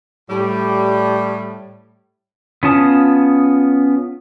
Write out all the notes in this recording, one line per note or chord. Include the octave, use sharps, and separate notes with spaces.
A2 G3
B3 C#4 F4 A5 D#6